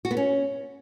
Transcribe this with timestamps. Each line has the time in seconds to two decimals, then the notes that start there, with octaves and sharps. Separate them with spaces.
0.05 F#4
0.11 B3
0.17 C#4